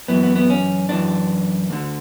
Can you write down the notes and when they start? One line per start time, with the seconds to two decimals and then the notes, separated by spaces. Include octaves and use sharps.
0.08 F#2 E3 B3
0.23 B3
0.35 B3
0.50 C#4
0.89 F#2 E3 D4
1.70 D2 D3